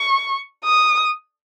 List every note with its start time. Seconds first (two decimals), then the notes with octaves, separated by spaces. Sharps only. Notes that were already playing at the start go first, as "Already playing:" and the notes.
Already playing: C#6
0.64 D#6